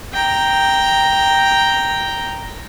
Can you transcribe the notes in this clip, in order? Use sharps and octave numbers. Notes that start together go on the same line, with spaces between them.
G5 A#5